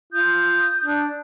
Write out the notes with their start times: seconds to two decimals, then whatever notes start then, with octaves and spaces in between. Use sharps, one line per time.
0.13 F4 D#6 G6
0.85 D4